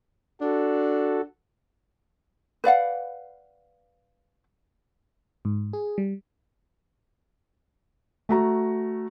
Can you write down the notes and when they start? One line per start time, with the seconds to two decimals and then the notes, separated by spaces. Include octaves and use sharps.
0.41 D4 F#4 A4
2.64 B4 D5 F5 F#5
5.45 G#2
5.73 G#4
5.98 G3
8.29 A3 F#4 A#5